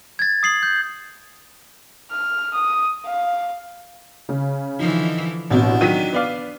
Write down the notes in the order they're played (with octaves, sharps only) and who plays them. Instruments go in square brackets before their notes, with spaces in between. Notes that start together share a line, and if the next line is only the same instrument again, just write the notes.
[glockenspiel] G#6 A6
D#6 C7 F#7
G6
[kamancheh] F6
D#6
F5
[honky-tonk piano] C#3
[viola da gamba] D3 E3 F3 [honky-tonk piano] D#4
[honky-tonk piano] A1 B2 [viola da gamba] D4
[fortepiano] D#3 F#3 [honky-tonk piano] B6 D#7
[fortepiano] B3 D5 F5